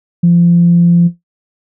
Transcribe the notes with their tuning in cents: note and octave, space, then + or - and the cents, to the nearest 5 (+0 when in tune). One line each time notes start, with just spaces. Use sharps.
F3 -25